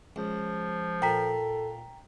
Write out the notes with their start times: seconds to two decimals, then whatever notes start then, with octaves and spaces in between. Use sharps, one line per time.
0.16 C#2 F3
1.02 A#2 A4 G5 A#5 B6